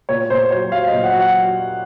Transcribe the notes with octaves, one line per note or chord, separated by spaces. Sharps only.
A#2 C#5
A#2 C5
F#3 C#5
F#3 F5
D#5
A#2
F#5
F#3
F#5